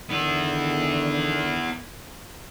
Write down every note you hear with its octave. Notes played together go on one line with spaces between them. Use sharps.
D3 D#3 B3 E4